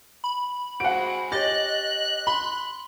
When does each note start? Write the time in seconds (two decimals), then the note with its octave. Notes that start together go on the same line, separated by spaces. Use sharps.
0.24 B5
0.80 G#3 C4 F#4 F#5 D7
1.32 G4 C#5 D#5 F#6 A6
2.27 B5 C6